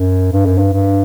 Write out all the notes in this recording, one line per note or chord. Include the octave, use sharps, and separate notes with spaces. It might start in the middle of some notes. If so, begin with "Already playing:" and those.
Already playing: F#2
G2
F#2
G2
G2